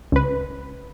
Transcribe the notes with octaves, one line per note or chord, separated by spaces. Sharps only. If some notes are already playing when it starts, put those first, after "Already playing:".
C#2 B4